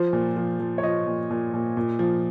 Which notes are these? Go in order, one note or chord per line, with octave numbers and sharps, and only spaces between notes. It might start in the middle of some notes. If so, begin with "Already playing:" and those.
Already playing: F3 C5
A#2
F3
F3
C#5
F3 D#5
A#2
A#2
A#2
A#2
F3